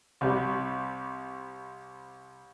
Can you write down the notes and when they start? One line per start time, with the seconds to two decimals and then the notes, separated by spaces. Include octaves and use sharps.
0.21 C2 G3